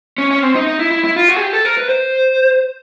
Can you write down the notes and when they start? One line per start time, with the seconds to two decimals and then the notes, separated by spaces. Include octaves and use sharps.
0.18 C#4
0.31 C#4
0.43 C4
0.55 D#4
0.67 D#4
0.79 E4
0.91 E4
1.04 E4
1.16 F4
1.28 F#4
1.36 G#4
1.41 G4
1.53 A4
1.65 A#4
1.77 B4
1.89 C5